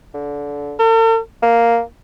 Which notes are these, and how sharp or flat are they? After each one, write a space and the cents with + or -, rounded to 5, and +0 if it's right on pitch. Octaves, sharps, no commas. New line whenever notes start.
D3 -25
A4 +45
A#3 +0